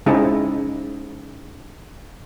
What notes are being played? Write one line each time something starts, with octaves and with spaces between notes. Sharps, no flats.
C#3 G#3 C4 D#4 E4 G#4